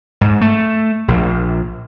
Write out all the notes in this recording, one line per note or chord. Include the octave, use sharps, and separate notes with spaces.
G#2
A3
A#1